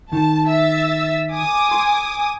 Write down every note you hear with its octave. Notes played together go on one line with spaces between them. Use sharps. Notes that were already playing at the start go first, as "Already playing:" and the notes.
D#3 A5
E5 E6 A6
G#5 D6 D#6
C6